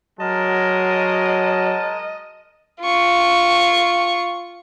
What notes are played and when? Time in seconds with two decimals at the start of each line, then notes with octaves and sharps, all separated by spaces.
0.20 F#3 G#3 A#4 D#5 A5
2.81 F4 C#6